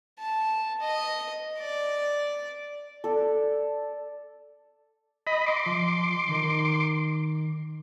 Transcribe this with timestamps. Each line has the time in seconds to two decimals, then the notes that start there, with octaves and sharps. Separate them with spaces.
0.19 A5
0.80 D#5
1.59 D5
3.04 A4 D5
5.27 D#5 B5
5.46 C6 D6
5.66 F3
6.29 D#3 D#4 A#4